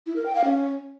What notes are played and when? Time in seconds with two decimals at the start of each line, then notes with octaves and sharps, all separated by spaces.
0.06 E4
0.16 A#4
0.26 G5
0.35 F5
0.45 C#4